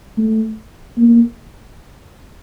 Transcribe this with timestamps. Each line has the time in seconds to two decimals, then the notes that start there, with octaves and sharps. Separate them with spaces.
0.18 A3
0.98 A#3